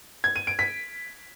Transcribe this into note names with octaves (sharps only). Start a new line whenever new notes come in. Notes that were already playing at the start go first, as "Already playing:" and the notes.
G#6
D#7
D7
B6